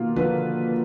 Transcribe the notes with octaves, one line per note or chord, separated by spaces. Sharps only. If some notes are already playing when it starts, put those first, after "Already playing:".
Already playing: B2 D#3 A#3 F4
D3 F3 B4